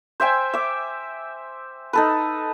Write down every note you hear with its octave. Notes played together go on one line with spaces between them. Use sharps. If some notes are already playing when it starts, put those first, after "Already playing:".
C5 E5 G5 G#5
E5 D6
D#4 A4 B4